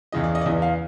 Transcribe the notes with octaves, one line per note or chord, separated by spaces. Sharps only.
E2 C#3 E3 D#5
D5
D#5
D5
E2 C#3 E3 D#5
F5